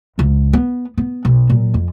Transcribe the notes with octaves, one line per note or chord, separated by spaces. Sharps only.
G1 C#2
B3
B3
B1
A#2 F#3
F2